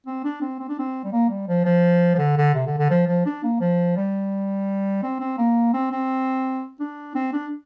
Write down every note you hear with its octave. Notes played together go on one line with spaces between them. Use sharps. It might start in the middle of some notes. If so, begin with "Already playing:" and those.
C4
D4
C4
C4
D4
C4
G3
A#3
G3
F3
F3
F3
D3
D3
C3
D3
D3
F3
F3
D4
A#3
F3
G3
C4
C4
A#3
C4
C4
D4
C4
D4